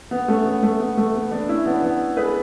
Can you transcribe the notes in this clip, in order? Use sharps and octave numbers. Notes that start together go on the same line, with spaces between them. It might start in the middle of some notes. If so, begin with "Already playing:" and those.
B3
A3 C#4
B3
A3
B3
A3
B3
B3 D4
C#4 E4
B3 D4
B3
G#4 B4